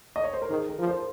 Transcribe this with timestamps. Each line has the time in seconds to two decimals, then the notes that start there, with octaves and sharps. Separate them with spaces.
0.16 D#5
0.24 C#5
0.33 C5
0.42 A#4
0.50 D#3 G#4
0.69 A#4
0.78 F3
0.87 C5